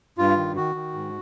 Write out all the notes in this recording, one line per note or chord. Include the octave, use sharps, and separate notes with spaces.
G2 F4
D#3
D#3 F#4
D#3
G#2